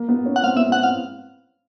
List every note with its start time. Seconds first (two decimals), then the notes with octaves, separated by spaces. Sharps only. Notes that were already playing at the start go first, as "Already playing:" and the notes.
Already playing: A#3
0.08 B3
0.26 C#4
0.36 F#5
0.43 C4 F5
0.56 B3 E5
0.69 C4 F#5
0.82 C4 F5